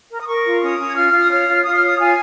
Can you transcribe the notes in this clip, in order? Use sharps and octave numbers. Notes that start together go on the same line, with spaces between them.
A#4
D#6
A#4 C#6
F4
C#4 D#6
C#4
G#6
F4 F6
F4
D#6
C#5 F6
F4
F4 D#6
F6
C#5 D#6
F4 G#5